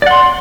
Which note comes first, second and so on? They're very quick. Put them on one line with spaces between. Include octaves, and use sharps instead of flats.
D5 F#5 C6